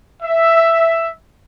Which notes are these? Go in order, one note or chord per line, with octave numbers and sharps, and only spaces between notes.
E5